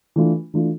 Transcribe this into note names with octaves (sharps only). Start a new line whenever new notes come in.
E3 A3 D4 F4
E3 A3 D4 F4